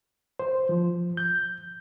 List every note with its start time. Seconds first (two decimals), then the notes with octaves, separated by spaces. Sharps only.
0.39 C5
0.69 F3
1.17 G6